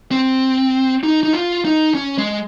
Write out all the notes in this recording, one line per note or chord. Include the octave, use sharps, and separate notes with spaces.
C4
D#4
D#4
F4
D#4
C#4
G#3